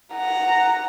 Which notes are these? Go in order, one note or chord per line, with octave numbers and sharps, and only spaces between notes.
F#5 A#5